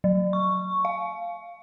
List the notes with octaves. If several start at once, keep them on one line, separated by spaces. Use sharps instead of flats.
F#3
C#6
F5